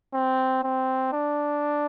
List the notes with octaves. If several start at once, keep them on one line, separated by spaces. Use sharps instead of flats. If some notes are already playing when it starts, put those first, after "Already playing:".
C4
C4
D4